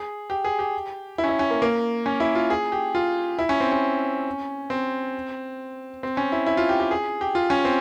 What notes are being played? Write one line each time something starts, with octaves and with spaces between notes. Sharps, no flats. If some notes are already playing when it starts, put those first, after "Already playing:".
Already playing: G#4
G4
G#4
G4
E4
C#4
E4
C#4
A#3
A#3
C#4
E4
F4
G#4
G4
F4
E4
C#4
C4
C#4
C4
C4
C#4
E4
E4
F4
G4
G4
G#4
G4
F4
C#4
C4